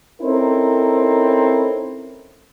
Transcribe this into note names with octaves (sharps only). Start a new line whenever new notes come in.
C4 C#4 D#4 E4 A4 A#4